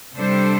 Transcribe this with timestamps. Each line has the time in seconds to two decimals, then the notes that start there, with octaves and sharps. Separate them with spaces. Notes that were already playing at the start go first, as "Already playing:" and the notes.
0.15 C3 G3 D4 A4 C5